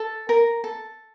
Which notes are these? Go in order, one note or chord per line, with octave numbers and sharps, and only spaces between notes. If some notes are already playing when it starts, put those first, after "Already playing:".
Already playing: A4
A#4
A4